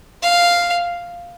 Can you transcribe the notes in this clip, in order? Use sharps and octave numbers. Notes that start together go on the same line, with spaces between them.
F5